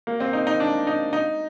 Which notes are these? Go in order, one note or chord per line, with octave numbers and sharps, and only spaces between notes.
A#3
C4
D#4
D#4
D4
D#4
D#4